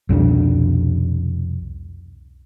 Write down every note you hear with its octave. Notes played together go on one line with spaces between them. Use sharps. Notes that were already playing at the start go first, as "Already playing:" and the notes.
C2 F2 B2 D4